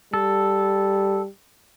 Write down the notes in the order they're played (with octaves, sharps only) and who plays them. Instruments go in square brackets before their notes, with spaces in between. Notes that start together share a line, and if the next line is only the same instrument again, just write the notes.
[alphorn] G3 [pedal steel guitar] A4